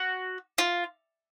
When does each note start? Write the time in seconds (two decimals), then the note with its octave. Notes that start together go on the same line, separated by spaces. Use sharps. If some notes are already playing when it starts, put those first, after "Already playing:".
Already playing: F#4
0.58 F4